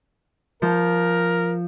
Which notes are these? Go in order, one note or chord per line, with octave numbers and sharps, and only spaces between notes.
F3 A#4